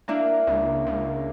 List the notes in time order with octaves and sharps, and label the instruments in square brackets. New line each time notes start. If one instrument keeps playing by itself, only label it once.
[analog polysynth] A#3 [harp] D4 E4
[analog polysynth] C#2
C#2